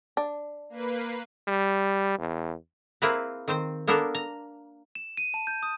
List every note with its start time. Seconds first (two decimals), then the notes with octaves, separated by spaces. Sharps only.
0.17 D4
0.70 A#3 B4 C7
1.48 G3
2.19 E2
3.02 A#3 C4 E4 G#4 A#4 B4
3.48 D#3 C4 C5
3.87 A#3 B3 D4 A4 A#4
4.15 A#5
4.95 E7
5.17 D#7
5.34 A5
5.47 G6
5.63 D#6